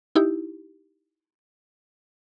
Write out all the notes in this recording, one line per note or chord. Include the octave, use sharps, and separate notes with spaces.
D#4 E4 G4